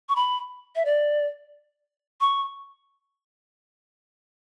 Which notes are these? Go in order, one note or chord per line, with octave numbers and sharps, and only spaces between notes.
C#6
B5
E5
D5
C#6